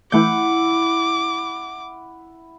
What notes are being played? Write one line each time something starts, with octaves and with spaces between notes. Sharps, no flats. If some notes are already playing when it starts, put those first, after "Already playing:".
E3 A3 E4 F#5 D6 G6